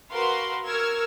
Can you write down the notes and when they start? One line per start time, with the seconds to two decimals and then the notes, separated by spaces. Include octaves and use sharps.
0.11 F#4 A#4 B4 F5 C6
0.66 A#4 C#6 E6 F6 G#6